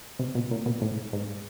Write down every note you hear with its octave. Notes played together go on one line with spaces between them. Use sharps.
C3
B2
A#2
B2
A2
G#2